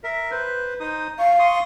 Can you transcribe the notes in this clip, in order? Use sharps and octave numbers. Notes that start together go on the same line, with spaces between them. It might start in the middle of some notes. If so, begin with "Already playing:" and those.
A#4 E5
B4 C5
D#4 C5 D#6
F5 C#6
C6 C#6 D#6